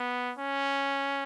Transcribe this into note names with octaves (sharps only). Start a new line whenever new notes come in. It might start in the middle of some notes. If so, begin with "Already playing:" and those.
Already playing: B3
C#4